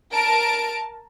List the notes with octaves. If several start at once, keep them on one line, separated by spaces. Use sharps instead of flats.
A#4 A5 D7